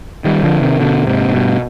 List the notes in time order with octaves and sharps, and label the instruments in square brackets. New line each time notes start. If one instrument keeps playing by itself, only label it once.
[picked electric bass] D#3 G3
D3 F3
C3 D#3
B2 D3
G#2 C3
G#2
G2 B2